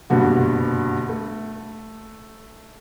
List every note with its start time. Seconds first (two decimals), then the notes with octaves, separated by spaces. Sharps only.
0.10 F#1 G2 B2 D3 F#4
1.09 A3